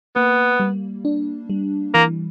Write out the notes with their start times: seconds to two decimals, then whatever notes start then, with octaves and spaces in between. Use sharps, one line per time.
0.16 A#3 B3
0.60 G3
1.05 D4
1.50 G3
1.94 E3 A#3